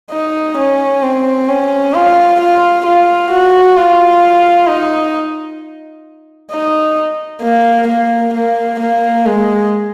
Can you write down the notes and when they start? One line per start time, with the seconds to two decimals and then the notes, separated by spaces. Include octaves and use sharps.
0.11 D#4
0.58 C#4
1.03 C4
1.49 C#4
1.94 F4
2.41 F4
2.86 F4
3.31 F#4
3.77 F4
4.69 D#4
6.52 D#4
7.43 A#3
7.88 A#3
8.34 A#3
8.80 A#3
9.26 G#3